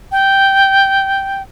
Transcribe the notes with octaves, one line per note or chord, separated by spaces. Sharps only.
G5